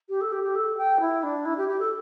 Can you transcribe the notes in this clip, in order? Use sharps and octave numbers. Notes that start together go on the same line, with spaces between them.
G4
A4
G4
G4
A4
G5
E4
D4
E4
G4
G4
A4